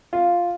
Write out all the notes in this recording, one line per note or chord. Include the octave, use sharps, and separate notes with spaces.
F4